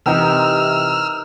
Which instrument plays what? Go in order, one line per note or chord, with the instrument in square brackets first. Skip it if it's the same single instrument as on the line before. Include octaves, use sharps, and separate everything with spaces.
[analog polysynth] C3 [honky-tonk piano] E3 G5 A#5 [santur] D#4 A#4 [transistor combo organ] E6 F6